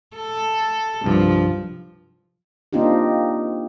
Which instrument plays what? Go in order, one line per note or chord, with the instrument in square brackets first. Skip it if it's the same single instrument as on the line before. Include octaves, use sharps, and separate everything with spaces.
[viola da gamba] A4
[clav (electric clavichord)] C2 G2 [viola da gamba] F3
[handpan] A#3 C4 D4 D#4 F4 G4